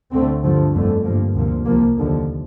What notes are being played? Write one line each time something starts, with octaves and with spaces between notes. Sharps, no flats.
D2 D3 A3 C4
G2 D3 F3 A3
G1 F2 D3 A3
G2 F3 A#3
D2 C3 F3 A#3
C2 C3 F3 A#3
F1 D#2 D3 F3